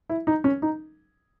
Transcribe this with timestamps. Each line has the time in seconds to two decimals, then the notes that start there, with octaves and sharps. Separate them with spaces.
0.10 E4
0.27 D#4
0.44 C#4
0.62 D#4